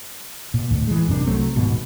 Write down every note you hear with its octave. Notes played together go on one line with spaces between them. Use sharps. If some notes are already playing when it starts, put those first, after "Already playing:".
A#2
D2 A2
E3 G#3
A1 F#2 C3 D4
C2 F#3 A3 C4
D#1 G#2 B2